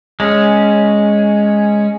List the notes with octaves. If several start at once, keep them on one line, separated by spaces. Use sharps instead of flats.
G#3 C#4